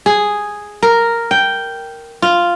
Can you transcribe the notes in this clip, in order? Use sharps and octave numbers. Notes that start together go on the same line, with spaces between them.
G#4
A#4
G5
F4